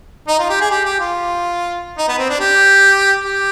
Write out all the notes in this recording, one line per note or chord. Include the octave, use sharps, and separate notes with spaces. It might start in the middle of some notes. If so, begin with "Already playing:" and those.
D#4
F4
G4
G#4
G4
G4
F4
D#4
B3
C4
D4
G4
G4